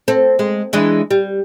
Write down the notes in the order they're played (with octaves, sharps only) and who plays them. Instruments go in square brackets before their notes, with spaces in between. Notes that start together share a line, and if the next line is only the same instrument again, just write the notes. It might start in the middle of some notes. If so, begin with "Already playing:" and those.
[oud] C4 A4
G#3
E3 G#3 D4
G3